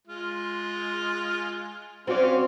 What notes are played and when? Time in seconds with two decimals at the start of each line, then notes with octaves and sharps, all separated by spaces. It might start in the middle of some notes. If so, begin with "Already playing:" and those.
0.08 G#3 F4
2.07 C4 C#4 F#4 D5 F5